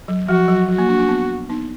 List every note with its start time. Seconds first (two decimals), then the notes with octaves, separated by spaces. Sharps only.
0.08 F#3
0.28 F3 F#4
0.48 F#3
0.68 F#3 F#4
0.78 A#3
0.89 A#3 D4
0.99 A#3 D4
1.09 B3
1.49 B3 D#4